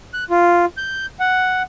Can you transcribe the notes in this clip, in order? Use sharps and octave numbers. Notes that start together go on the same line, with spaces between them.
F#6
F4
G6
F#5